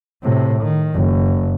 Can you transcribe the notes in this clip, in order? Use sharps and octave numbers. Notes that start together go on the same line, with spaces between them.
A2 C3
D#3
F#1